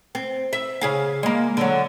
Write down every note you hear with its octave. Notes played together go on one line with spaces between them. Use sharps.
C4
E5
C#3 G#4 F5
G#3 A#3
D3 F#3